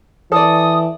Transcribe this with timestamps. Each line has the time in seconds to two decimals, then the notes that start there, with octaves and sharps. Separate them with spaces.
0.32 E3 A4 D5 D#6